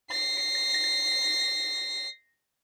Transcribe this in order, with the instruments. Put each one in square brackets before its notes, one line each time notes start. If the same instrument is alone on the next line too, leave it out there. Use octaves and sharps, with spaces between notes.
[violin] A#6 C7